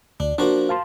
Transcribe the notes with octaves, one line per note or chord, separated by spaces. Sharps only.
D2 D4
F3 A#3 D4 F#4
F5 A5 C6